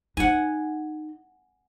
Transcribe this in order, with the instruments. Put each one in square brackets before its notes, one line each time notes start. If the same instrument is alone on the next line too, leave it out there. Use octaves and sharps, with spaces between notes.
[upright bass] D#4 [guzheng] F#5 G#5